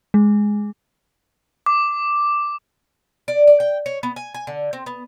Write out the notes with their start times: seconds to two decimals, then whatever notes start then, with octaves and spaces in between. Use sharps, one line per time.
0.14 G#3
1.66 D6
3.28 D5
3.47 D5
3.60 G5
3.86 C#5
4.03 B3
4.16 G#5
4.34 G#5
4.47 D3
4.73 C4
4.86 B3